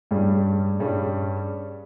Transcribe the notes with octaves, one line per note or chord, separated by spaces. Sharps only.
G2 G3 C#4 G#4
G2 G3 C#4 G#4